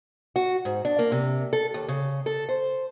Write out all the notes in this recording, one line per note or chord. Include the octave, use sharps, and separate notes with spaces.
F#4
G#2
D4
A#3
C3
A4
D#2
C#3
A4
C5